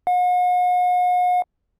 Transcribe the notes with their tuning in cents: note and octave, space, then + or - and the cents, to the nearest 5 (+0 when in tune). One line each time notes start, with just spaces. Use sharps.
F#5 -45